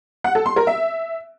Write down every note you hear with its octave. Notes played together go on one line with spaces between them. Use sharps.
F#5
A4
C6
A#4
E5